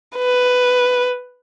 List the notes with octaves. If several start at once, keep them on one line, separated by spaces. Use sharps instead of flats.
B4